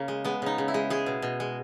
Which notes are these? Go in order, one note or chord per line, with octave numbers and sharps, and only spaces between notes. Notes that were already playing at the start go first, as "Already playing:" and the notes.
Already playing: C#3 A#3
G#3
G#3 B3
C#3 D#4
C#3
E4
G#3
G#3 G#4
B2
B2
G#3